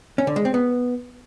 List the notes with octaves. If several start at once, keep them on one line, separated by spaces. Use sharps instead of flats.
C#4
D3
G#3
C4
B3